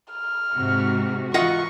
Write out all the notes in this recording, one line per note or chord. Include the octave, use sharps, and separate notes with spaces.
F6
G#2 C3 F#4
E3 F4 D#5 F#5 C#6